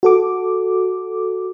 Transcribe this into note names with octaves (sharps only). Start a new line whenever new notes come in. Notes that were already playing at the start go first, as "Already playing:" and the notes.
F#4 A4 D6